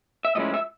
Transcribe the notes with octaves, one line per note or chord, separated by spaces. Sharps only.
E5
A2 F3 G#3 C#4 E4 D#5
E5